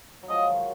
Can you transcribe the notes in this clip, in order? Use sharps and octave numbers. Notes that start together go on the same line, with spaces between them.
F#3
F3 G#3 D#5
D#3 F#3